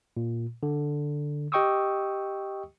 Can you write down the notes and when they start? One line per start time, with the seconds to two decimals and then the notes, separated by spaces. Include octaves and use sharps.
0.17 A#2
0.63 D3
1.52 G4 D#5 G5 C#6 D#6 E6